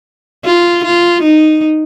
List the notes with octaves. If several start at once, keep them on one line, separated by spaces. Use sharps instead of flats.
F4
F4
D#4